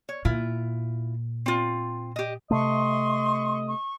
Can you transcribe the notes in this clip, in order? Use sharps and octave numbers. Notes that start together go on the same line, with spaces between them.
C#5
A#2 E4 F4
C4 F4
G4 D#5
C3 A3 D#5 C6 C#6
C#6